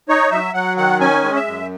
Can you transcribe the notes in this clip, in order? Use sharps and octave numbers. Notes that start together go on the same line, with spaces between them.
D#4 C#5
F#3 E5
F#3 F#5
D#3 F#5
C#4 G#5
G#3
E5
F#2